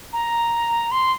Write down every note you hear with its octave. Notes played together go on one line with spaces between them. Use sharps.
A#5
C6